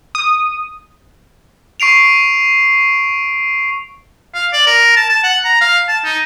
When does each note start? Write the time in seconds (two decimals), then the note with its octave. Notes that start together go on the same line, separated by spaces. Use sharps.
0.15 D#6
1.80 C#6 C7 D7 F7
4.34 F5
4.53 D5
4.66 A#4
4.96 A5
5.09 A5
5.23 F#5
5.44 A#5
5.61 F5
5.88 A5
6.04 D#4